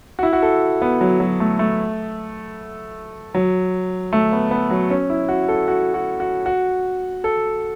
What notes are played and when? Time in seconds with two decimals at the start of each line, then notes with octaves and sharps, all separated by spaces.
0.19 F#4
0.23 E4
0.33 F#4
0.42 A4
0.82 B3
1.01 F#3
1.20 F#3
1.40 A3
1.59 A3
3.34 F#3
4.13 A3
4.32 B3
4.51 B3
4.70 F#3
4.90 C#4
5.10 E4
5.29 F#4
5.48 A4
5.68 F#4
5.94 F#4
6.20 F#4
6.46 F#4
7.24 A4